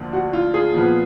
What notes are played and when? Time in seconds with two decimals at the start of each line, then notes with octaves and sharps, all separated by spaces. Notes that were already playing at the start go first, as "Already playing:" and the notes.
Already playing: D2 D3 F3 A#3 D4
0.13 F#4
0.33 F4
0.54 F4 G#4
0.74 A#2 F3 B3